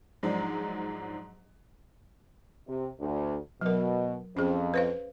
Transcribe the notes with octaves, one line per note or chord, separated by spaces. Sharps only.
G#2 F3 F#3 G#3 D4
C3
D2
B2 F#3 A#4
F2 C#4 G#4
B4 C5 F5